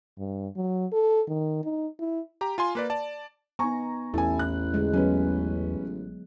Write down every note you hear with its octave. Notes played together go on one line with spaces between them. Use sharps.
G2
F#3
A4
D#3
D#4
E4
G4 A#5
F4 G#5 C6
A#3 B4 D5
D5 A5
B3 D#4 G#5 A#5 C#6
A1 E2 E4 A4 G#5
F#6
D3 G#3
F#3 B3 C#4 B4